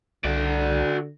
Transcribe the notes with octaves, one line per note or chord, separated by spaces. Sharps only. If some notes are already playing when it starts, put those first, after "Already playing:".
C2 D3 F#4 D5